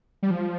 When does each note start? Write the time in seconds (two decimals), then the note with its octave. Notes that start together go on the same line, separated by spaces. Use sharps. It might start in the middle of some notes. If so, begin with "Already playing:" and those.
0.23 G3
0.31 F3